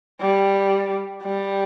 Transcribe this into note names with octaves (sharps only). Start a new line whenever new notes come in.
G3
G3